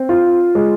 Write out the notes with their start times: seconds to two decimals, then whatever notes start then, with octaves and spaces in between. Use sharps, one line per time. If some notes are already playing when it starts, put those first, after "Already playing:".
Already playing: C4
0.09 F4
0.55 G#3